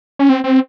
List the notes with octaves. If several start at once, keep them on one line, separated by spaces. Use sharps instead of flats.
C#4
C4
C4